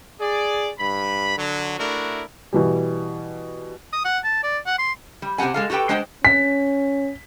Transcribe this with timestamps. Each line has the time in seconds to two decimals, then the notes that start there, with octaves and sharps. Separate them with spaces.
0.21 G#4 D5
0.79 G2 B5
1.37 D3 F#3
1.79 A3 D4 E4 F#4 A#4
2.53 B2 E3 G3
3.93 D#6
4.05 F#5
4.24 A5
4.43 D5
4.66 F#5
4.78 C6
5.22 G3
5.38 C3 C4 G4 F#5 G#5
5.54 G#3 A4 F5
5.70 F#4 G4 A4 B4 G5
5.89 G#3 D4 C5 F#5 G5
6.25 C#4 B6